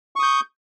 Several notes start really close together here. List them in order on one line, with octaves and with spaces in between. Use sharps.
C#6 D#6 G6